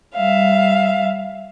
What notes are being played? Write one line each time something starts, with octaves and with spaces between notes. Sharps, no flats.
G3 E5 F5